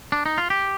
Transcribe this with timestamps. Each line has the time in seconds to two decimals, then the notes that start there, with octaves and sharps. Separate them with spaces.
0.12 D4
0.26 D#4
0.38 F4
0.50 G4